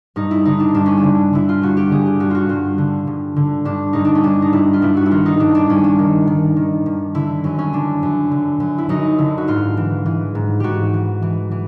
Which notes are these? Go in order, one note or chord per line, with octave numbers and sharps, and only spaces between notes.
G2 D#4
E4
D3 D#4
D4
G2 D4
C#4
D4
D3
D3 E4
F4
G2 F#4
G4
D3 G#4
G4
G2 F#4
F4 F#4
G2 F4
D3
G2
D3
G2 D4
G2 D#4
D4
C#4
G2 D4
D#4
G2 E4
F4
G2 E4
F#4
E4
D#3 F4
D#4
G2 D4
D4
G2 C#4
D4
D#3
D#3
D#3
G2
D3 E4
F#2 C#4
C#4
D3 D4
F#2
D3
F#2
E4
F#2 D#4
D3 E4
F#4
G#2 F4
E3
E3
G#2
G#2 F#4 G4
E3
E3
E3